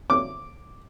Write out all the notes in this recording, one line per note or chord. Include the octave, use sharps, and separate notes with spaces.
D6